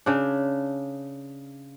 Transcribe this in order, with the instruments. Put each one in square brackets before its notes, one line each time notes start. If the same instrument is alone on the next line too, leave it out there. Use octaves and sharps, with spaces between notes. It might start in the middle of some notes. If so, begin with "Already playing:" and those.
[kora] C#3 D4